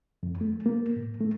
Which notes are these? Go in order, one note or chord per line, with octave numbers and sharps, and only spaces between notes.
F2
A3
A#3
A2
A3